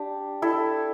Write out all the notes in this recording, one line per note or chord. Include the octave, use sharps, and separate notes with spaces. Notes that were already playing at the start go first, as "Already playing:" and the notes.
Already playing: D4 G4
E4 A4